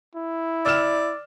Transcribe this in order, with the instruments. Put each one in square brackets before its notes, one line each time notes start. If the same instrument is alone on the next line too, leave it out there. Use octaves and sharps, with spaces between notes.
[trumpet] E4
[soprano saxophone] D5 [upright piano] E6 F6 E7